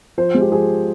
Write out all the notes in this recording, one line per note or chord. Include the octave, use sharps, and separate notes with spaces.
F3 C5
G#3
G4
F3 G#4